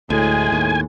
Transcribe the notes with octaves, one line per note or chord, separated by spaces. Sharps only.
D2 A2 G#3 G#5
D#2